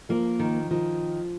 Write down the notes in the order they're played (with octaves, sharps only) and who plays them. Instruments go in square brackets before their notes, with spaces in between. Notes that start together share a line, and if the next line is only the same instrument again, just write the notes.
[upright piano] F3 [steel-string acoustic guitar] A#3
[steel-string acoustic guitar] D#3
[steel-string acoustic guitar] D#3 [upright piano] F3